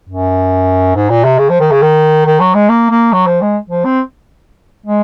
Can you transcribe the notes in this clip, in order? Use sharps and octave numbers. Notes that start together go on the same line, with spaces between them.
F#2
G#2
A#2
C3
C#3
F3
D#3
C#3
D#3
D#3
F#3
G#3
A#3
A#3
F#3
F3
G#3
F3
C4
G#3